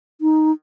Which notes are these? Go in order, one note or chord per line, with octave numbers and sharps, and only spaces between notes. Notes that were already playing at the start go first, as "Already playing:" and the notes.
D#4